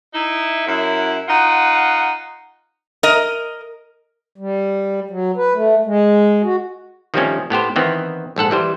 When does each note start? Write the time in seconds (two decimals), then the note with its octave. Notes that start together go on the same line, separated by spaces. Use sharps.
0.14 D#4 E4
0.66 F#2 E4
1.28 D#4 F4 F#5
3.03 A#4 D#5
4.38 G3
5.10 F#3
5.37 B4
5.54 A3
5.86 G#3
6.43 F#4
7.14 D#3 F3 G3 A3 C4 C#4
7.50 A2 B3 G4 C5
7.76 D#3 E3 B3 C4
8.36 A#1 G#2 A4 F#5
8.51 E3 G3 C5